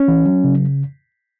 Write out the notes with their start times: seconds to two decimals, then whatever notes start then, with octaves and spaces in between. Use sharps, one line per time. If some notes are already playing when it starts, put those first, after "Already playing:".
Already playing: C#4
0.08 E3
0.26 F#3
0.44 C#3